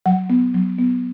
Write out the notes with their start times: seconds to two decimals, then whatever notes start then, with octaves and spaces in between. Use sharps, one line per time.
0.06 F#3 F#5
0.30 B3
0.54 F#3
0.79 B3